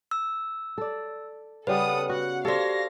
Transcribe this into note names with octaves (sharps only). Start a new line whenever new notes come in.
E6
A4 D5
C#3 G3 B3 A4 B4 F#5 D#6
F#4 F#5
G4 A4 C5 D5 F5 A#6